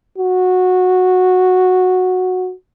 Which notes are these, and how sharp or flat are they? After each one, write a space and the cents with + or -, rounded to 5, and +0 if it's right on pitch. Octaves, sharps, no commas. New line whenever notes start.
F#4 -10